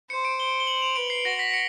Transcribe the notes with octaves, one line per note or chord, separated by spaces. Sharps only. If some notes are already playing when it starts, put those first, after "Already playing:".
C5 C#7
D7
G7
G7
F#7
F7
B4 D7
C7
F#4 A#6
B6
C#7